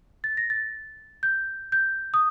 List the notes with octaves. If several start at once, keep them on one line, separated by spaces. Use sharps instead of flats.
A6
A#6
A6
G6
G6
D#6